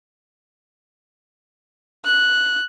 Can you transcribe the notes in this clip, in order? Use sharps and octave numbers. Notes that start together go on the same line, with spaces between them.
F#6